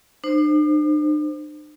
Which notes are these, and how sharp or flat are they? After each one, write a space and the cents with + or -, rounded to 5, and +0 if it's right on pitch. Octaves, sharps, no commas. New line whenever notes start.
D4 +45 C5 +0